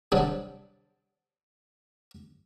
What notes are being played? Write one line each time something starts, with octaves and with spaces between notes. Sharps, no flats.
C3 F#3 G3 D4